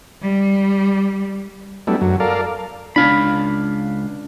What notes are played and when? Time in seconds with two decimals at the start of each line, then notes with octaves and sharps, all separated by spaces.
0.22 G3
1.87 F#3 G3 A3 B3 D4 E4
2.01 F#2 F#3
2.20 A4 A#4 D5 F5
2.96 C#2 D4 F5 B5